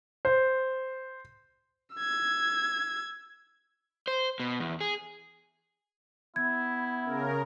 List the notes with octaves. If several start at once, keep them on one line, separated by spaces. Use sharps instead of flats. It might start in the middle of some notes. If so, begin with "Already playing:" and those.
C5
E6 G#6
C5
B2
E2
G#4
B3 E4 G#6
C#3 A#4